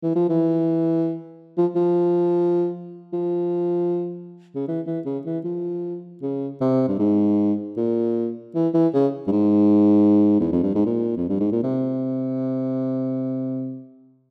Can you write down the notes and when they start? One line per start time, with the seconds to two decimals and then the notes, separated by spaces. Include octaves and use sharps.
0.03 E3
0.15 F3
0.29 E3
1.57 F3
1.75 F3
3.13 F3
4.55 C#3
4.68 E3
4.86 E3
5.05 C#3
5.25 E3
5.44 F3
6.22 C#3
6.61 C3
6.88 G2
6.99 G#2
7.77 A#2
8.55 E3
8.74 E3
8.93 C#3
9.27 G2
9.32 G#2
10.40 E2
10.52 F2
10.63 G2
10.75 G#2
10.86 A#2
11.17 F2
11.29 G2
11.40 G#2
11.52 A#2
11.63 C3